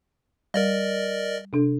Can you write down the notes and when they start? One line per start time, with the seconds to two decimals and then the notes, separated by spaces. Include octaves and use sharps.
0.54 G3 A#4 D5 D#5
1.53 C3 D4 A4